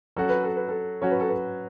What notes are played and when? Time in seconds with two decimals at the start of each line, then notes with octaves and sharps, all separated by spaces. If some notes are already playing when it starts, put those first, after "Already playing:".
0.16 F#3 C#4 F#4 A4
0.29 B4
0.43 A4
0.56 B4
0.68 A4
1.02 F#3 C#4 F#4 C#5
1.11 B4
1.20 A4
1.29 B4